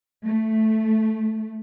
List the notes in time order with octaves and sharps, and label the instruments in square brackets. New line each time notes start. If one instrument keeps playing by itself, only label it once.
[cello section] A3